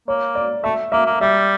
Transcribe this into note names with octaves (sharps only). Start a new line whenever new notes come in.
A#3 C#5
D5
A3 E5
A#3 E5
A#3
G3 E5